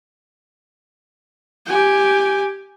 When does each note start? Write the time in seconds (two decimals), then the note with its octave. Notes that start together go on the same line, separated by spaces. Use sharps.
1.66 G4 G#5